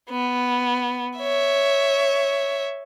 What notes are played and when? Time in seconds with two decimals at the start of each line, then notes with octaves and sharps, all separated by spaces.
0.10 B3
1.19 C#5 E5